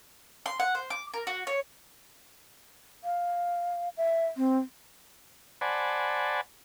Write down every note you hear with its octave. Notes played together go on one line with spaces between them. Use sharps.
C6
F#5
C5
D6
A#4
F#4
C#5
F5
E5
C4
C5 D5 F#5 G#5 A5 B5